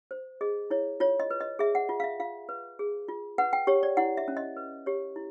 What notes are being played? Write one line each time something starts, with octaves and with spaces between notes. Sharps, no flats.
C5
G#4 D#5
E4 C#5
F4 C#5
D#5
B4
D#5
G#4 E5
F#5
F4
F5
E5
F4 F5
B4
G#4
F4
B4 F#5
G5
G4 C#5
D5
E4 F#5
E5
C#4
D#5
B4
G4 C#5
E4